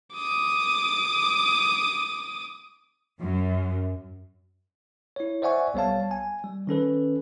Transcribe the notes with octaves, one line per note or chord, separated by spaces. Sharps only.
D6 D#6
F#2
E4 C#5
C5 D5 E5 F#5 G#5 C#6
B1 G3 B3 C#5 F5 A5
G#5
G3
D#3 C#4 A4 B4